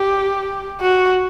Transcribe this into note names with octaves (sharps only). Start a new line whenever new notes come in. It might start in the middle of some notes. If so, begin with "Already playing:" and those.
Already playing: G4
F#4